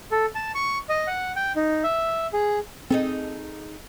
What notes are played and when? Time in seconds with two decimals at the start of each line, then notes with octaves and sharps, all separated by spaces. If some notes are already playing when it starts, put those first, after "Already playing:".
0.11 A4
0.35 A5
0.55 C#6
0.89 D#5
1.07 F#5
1.36 G5
1.56 D#4
1.83 E5
2.33 G#4
2.90 C4 D#4 G#4 A4